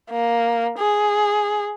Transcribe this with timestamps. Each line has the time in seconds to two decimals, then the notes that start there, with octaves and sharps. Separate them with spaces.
0.11 A#3
0.78 G#4